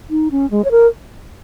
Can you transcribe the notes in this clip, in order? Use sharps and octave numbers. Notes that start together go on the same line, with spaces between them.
D#4
C#4
G#3
C#5
A#4